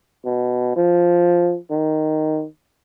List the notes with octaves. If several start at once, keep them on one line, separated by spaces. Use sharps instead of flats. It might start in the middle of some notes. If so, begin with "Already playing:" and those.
B2
F3
D#3